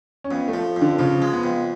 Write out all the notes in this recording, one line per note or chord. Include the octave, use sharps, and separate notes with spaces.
C#4
F2 B3
A3
F3
F2 D3
C#3 F3
G#3
B3
F2